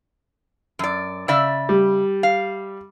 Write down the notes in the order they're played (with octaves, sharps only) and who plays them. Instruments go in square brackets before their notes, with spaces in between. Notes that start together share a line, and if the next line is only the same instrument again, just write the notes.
[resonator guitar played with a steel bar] F#2 D5
C#3 D5 E5
[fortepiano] G3
[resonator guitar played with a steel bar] F5